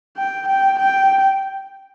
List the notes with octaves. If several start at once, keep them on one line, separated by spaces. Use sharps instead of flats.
G5
G5
G5